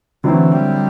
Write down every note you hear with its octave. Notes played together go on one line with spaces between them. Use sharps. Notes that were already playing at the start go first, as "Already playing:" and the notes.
D3 E3 F#3 A3 C4 E4
G3